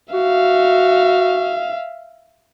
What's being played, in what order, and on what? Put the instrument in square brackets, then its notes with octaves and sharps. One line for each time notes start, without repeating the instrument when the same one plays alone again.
[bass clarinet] F#4 [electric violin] E5 F5